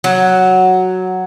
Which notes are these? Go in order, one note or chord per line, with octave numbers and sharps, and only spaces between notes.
F#3